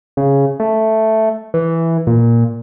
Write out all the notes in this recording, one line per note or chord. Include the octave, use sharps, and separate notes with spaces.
C#3
A3
E3
A#2